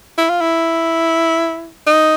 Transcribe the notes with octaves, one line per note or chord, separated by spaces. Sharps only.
E4
F4
E4
D#4